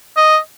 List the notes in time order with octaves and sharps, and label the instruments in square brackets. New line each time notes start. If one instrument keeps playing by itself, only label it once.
[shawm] D#5